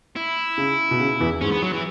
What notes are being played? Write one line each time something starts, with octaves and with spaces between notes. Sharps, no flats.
E4
C#3
B2
C#3
E2 E3
G#2 G#3 C#4
B3
F#3
E3